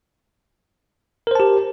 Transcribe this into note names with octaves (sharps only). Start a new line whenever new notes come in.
G4 A#4 C5 A5